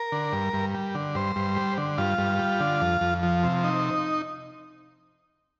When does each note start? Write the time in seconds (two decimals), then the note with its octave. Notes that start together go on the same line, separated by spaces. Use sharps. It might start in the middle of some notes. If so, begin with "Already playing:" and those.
Already playing: A#4
0.12 D3
0.32 G2
0.53 G2
0.75 G3
0.95 D3
1.15 G2 C5
1.36 G2
1.56 G3
1.78 D3
1.98 G2 F4
2.18 G2
2.39 G3
2.60 D3
2.81 F2
3.01 F2
3.23 F3
3.43 C3
3.64 D#4